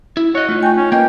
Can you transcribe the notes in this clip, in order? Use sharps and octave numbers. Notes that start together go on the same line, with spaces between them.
E4
F#4 C#5 D#5
A3 D#4 F4
G5 G#5 C#6
C#4
A#3 B4 D#5 G5 G#5